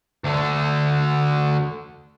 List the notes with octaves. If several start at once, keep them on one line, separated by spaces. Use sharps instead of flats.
D2 D3